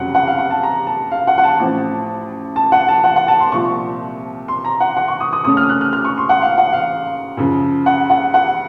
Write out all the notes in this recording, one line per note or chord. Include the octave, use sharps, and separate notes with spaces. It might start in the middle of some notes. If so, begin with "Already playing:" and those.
Already playing: F1 F2 C#3 F#3 F#5
F#5
F5
F#5
A5
A#5
A5
F5
F#5
F#5
A5
A1 A2 F3 C4
A5
F#5
A5
F#5
F#5
A5
C6
C2 A#2 F3 C#6
C6
A#5
F#5
F#5
C#6
D#6
D#6
F2 C#3 A3 C#4 D#6
F6
F#6
F6
F6
C#6
C6
F#5
F5
F#5
F5
F#2 C#3 F3
F#5
F#5
F#5